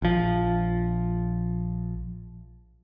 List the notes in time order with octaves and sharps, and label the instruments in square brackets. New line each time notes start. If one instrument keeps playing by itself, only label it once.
[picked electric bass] A#1 F3